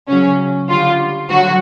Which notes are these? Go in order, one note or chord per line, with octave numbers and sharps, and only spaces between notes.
C#3 F#3 C#4
D3 G3 F4
D3 F#3 F#4